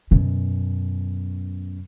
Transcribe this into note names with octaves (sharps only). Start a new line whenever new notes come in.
F#2 B2